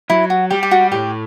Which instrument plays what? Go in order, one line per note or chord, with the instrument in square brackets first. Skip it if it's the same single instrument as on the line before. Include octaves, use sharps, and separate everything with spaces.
[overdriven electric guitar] F#3 [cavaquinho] E4
[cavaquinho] F#4
[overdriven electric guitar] G3 [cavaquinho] G4
[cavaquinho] G4
F#4
[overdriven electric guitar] A2 [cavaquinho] G4